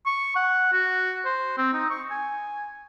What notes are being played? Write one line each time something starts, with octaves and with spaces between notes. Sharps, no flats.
C#6
F#5
F#4
C5
C4
D#4
C#6
G#5